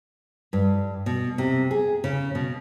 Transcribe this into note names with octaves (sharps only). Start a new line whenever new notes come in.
G2
B2
C3
G#4
C#3
B2